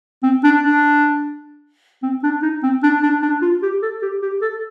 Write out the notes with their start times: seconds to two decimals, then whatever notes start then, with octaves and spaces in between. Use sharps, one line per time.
0.23 C4
0.44 D4
0.63 D4
2.03 C4
2.23 D4
2.42 D#4
2.63 C4
2.83 D4
3.03 D4
3.22 D4
3.42 F4
3.62 G4
3.82 A4
4.02 G4
4.22 G4
4.41 A4